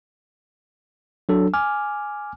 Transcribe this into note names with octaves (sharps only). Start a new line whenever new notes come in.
F#3 D4 A4
G#5 D6 F6